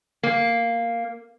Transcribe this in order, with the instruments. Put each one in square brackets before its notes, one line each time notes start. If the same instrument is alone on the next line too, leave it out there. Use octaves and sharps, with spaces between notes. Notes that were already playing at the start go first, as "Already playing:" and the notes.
[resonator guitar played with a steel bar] A#3